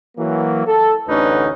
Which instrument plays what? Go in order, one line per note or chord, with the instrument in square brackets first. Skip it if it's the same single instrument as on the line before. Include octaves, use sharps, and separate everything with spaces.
[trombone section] E3 F#3 A#3
A4
A1 D2 D3 C#4 D#4 B4